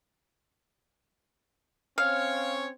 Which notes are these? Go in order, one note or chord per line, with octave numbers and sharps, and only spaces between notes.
C4 C#4 C#5 F5